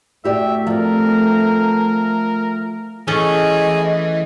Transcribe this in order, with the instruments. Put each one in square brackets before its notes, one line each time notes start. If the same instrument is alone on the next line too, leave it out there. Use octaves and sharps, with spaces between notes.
[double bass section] A3 [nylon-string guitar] F#4 G4 D5 [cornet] E5
[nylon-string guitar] F3 C4 [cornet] A#4
[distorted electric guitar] E3 [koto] A3 C#4 A4 [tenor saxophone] G#4 [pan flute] D#5